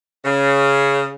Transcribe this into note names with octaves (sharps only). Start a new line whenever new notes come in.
C#3